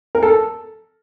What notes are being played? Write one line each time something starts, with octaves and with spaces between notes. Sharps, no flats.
A#4
A4